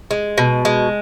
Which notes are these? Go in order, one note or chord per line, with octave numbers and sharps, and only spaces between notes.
G#3
B2
G#3